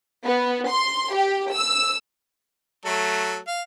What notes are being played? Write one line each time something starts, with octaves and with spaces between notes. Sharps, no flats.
B3
C6
G4
E6
F#3 A3 A4
F5